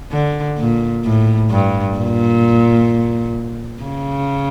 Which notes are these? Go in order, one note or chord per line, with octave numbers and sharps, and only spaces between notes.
D3
A#2
A2
G2
A#2
C#3